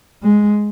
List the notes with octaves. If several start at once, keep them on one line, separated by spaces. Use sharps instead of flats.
G#3